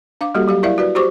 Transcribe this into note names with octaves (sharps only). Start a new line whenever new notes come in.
D4 F5 D6
G3 A#3 F#4 G4 A4
F#3 G4 F5
E4 A#4 D5 E5 F5
F#4 B4 D5
F#4 G4 C5 C#6 D6